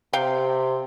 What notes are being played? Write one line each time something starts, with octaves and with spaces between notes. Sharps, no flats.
C3 F5 G5